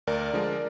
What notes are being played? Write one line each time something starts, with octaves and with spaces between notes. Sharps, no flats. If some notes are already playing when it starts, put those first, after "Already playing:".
D2 A#4 D5
D3 F3 G#3